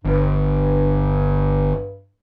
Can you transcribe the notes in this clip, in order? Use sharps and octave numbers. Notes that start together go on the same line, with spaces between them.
G1 G2